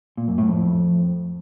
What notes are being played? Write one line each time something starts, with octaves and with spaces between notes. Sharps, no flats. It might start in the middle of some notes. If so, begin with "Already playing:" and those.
A#2
F#2
A2
F2